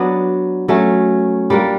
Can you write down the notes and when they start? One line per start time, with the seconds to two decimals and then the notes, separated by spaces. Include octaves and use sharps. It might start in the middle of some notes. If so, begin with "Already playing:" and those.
Already playing: F#3 B3 D4
0.68 F#3 A3 C#4
1.50 G3 A#3 D4 F4